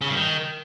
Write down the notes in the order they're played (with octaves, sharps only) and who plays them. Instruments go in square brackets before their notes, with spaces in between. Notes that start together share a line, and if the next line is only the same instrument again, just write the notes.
[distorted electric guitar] C#3
G2
D#3